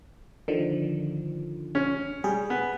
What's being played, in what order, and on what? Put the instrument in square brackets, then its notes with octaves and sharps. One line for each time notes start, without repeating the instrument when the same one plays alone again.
[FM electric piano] D3 D#3 F3
[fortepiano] C#4
[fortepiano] G3 [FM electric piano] G#4
[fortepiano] B3